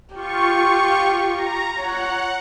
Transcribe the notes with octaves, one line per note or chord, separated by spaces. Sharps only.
F4 G4 C#6
A#5
C#5 F#5